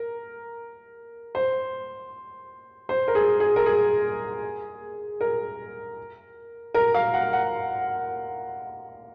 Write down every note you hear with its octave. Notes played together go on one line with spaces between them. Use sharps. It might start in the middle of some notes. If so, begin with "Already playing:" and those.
Already playing: A#4
C5
C5
A#4
G#4
G#4
A#4
G#4
A#4
A#4
F5
F#5
F#5